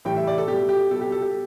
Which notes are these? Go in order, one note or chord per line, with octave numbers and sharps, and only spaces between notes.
A2 E3 G3 G5
E5
D5
A4
B2 G3 G4
G4
B2 G3 A4
G4
A4
G4